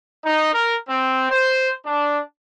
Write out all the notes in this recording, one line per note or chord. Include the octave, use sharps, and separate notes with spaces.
D#4
A#4
C4
C5
D4